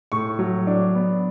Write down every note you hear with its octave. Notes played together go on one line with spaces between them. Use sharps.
A2 C#6
F#3
D4
B3